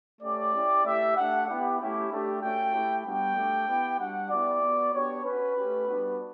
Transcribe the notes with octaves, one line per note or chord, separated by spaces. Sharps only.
A3 C#4 G4 D5
C#4 E4 G4
A3 E4 G4 E5
A3 D4 G4 F#5
B3 E4 G4
A3 C#4 E4 G4
A3 D4 G4
A3 C#4 F#4 G5
A3 E4 G4
G3 B3 D4 F#4 G5
A3 D4 G4
B3 E4 G4
G3 D4 F#4 F#5
B3 E4 G4 D5
B3 F#4
B3 D4 G4 C#5
C#4 F#4 B4
A3 C#4 G4
G3 B3 D4 F#4